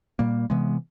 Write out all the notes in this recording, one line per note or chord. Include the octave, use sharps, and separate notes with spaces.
A#2 G3 A#3
C3 E3 G#3 B3